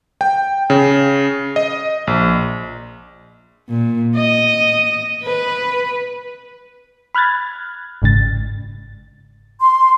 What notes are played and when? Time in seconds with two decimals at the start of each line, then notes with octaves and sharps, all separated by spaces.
0.21 G5
0.70 C#3
1.56 D#5
2.07 A#1
3.69 A#2
4.15 D#5
5.24 B4
7.15 B5 F6 F#6 G#6 A6
8.02 G1 G#2 C#3 A6
9.60 C6